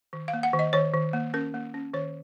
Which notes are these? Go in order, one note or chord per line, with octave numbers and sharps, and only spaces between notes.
D#3
F5
A#3
F#5
D#3
D#5
D#3 C#5
D#3
A#3
C#4 A#4
A#3
C#4
D#3 C#5